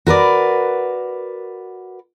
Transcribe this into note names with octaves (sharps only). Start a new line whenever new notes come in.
F#4 A#4 B4 D5